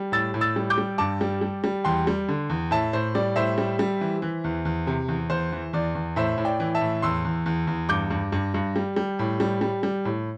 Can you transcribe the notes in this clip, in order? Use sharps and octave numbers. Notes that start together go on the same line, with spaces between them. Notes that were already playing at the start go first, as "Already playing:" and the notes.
Already playing: G3
A2 E6 A6
A2
E6 A6
G3
D6 G6
G3
G2 A5 D6
G3
G3
G3
E2 G5 C6
G3
D3
E2
A2 E5 A5
A2 C5
G3 D5
A2 C5 E5
G3
G3
E3
E3
E2
E2
C3
E2
E2 C5
E3
E2 D5
E2
A2 C5 E5
A2
D5 G5
E3
E5 A5
A2
E2 C6 E6
E2
E2
E2
G2 D6 G6
G2
G2
G2
G3
G3
A2
G3
G3
G3
A2